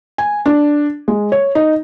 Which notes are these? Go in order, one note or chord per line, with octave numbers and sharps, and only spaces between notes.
G#5
D4
G#3
C#5
D#4